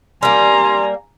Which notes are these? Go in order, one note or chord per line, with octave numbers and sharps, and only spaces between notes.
G3 A#3 G#5 A#5 C6